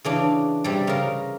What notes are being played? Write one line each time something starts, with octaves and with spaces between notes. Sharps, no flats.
C#3 E3 D4
C3 G3
C#3 A#4